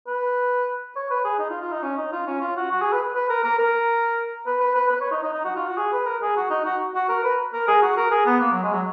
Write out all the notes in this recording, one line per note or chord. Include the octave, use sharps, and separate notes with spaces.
B4
C#5
B4
G#4
D#4
F4
F4
D#4
C#4
D#4
F4
C#4
F4
F#4
F#4
G#4
B4
B4
A#4
A#4
A#4
B4
B4
B4
B4
C#5
D#4
D#4
D#4
F#4
F4
F#4
G#4
B4
A#4
G#4
F#4
D#4
F#4
F#4
A#4
B4
A#4
G#4
F#4
A#4
G#4
B3
A#3
F#3
G#3
F#3